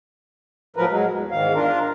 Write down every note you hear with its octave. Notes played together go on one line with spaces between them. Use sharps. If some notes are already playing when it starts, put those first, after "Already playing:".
A2 F3 F#3 A#4 B4
F#3 G#3
E2
E2 G#2 D#3 F5
D4 F4 A#4